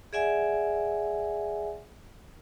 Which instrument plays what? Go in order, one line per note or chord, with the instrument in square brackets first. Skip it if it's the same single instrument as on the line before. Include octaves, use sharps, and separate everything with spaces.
[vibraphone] G#4 D5 E5 F#5 G#5